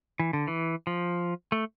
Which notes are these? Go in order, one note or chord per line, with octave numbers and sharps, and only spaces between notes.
E3
D3
E3
F3
A3